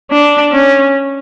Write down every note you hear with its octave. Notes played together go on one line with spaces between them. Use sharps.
D4
C#4